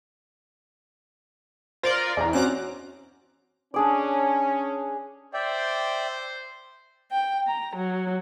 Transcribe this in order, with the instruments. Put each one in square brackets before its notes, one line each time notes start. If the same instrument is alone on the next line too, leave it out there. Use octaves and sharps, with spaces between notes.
[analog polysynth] F4 A#4 D5 [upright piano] C5
[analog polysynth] E2 [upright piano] D5 A#5
[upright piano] C4 C#4 F#4 [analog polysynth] A#5 D6 F#6
[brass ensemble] C#4 [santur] D4 G#4 D5
[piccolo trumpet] C5 [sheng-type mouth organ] D5 E5 G5
[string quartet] G5
A#5
F#3